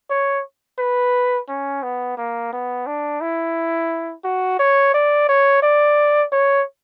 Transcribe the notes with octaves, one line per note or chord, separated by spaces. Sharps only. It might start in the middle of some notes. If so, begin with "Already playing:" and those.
C#5
B4
C#4
B3
A#3
B3
D4
E4
F#4
C#5
D5
C#5
D5
C#5